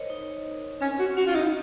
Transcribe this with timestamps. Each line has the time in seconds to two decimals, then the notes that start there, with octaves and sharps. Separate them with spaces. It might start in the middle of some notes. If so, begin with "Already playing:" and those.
Already playing: A#4 C5 C#5 D#5
0.10 D#4
0.81 C4 C#4
0.99 C4 F#4
1.17 C#4 F#4
1.27 F4
1.35 D#4 F#4